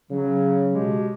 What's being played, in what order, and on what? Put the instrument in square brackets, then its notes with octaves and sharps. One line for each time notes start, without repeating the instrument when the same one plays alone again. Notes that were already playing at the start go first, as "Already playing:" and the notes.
[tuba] C#3 [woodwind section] F#3
[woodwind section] B2 G#3 G4